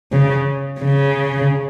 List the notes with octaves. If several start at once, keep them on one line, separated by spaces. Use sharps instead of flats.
C#3
C#3